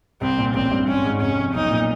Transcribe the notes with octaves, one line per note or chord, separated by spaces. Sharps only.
C2 C4
A#2
A1 C4
G2
G#1 C#4
G#2
F1 C#4
F2
B1 D#4
A#2